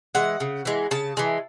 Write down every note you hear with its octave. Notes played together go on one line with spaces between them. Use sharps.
E3 G#3 F#5
C#3
E3 G#3
C#3 A5
E3 G#3